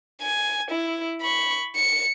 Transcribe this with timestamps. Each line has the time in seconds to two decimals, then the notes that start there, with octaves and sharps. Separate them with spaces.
0.22 G#5
0.71 E4
1.21 B5 C#6
1.76 C#7